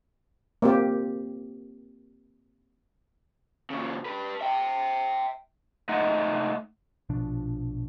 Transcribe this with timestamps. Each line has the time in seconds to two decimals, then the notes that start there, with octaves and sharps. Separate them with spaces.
0.62 A#3 C4 G4
3.70 A#2 C#3
4.06 G4 B4
4.41 E5 G5
5.89 A3 D#4 D#5 F#5
7.09 A#1 B2 F3 D4